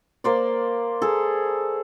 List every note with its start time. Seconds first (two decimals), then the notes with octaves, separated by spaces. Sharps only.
0.24 A#3 C5 D5
1.02 G#4 A4